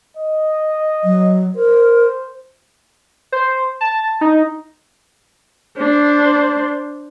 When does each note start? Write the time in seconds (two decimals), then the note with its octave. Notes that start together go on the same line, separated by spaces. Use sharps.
0.17 D#5
1.04 F#3
1.56 A#4 C5
3.32 C5
3.81 A5
4.21 D#4
5.78 D4 C5